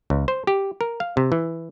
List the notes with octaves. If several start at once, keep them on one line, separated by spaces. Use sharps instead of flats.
C#2
C5
G4
A#4
F5
C3
E3